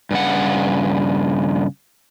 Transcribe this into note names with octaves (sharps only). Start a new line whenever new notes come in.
G2 C#3 F#5